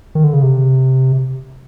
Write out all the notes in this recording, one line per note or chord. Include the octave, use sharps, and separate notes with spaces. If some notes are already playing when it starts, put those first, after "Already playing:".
D#3
D3
C#3
C3